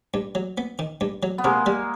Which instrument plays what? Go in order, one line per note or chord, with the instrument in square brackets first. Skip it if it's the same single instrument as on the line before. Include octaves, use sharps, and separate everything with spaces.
[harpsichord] G2
F#3
B3
D#3
G2
F#3
[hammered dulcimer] B3
[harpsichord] C3 [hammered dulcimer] G#3 A#3
[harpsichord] G3